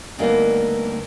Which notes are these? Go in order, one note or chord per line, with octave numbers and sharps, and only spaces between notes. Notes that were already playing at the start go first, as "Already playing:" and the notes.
D2 G2 A#3 B3 D#4 F5